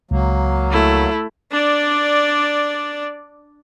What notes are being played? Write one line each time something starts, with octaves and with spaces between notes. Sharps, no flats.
C#2 F#3 A#3
A3 E4
D4 D5